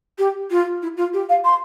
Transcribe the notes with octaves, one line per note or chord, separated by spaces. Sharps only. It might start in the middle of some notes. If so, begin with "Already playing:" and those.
G4
F4
E4
F4
G4
F5
C6